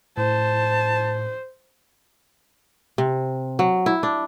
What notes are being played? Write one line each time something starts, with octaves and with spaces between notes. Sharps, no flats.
A2 C5 A5
C3
F#3
E4
D4